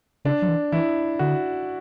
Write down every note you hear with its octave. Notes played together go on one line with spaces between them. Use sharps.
C#3 D4
F#3
E3
E3 E4
D3 F#4